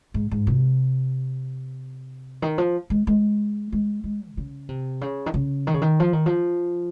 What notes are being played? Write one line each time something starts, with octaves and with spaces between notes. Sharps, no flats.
G#2
G#2
C3
D#3
F3
G#3
G#3
G#3
G#3
C3
C#3
C3
C#3
D#3
C#3
D#3
C#3
D#3
F3
D#3
F3